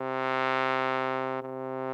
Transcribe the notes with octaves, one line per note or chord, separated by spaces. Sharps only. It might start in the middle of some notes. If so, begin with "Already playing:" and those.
Already playing: C3
C3